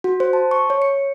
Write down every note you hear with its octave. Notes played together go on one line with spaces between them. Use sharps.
F#4
C5
A5
C#6
C#5
C#7